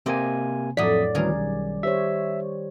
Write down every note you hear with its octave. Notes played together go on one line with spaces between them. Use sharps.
C3 A#3 C4 D5 D#5 G#5
F2 A2 F#3 D5 D#6 B6
D2 D#3 E3 F#3 G3 C#4 G#4 A#4
B1
G4 C5 C#5 E5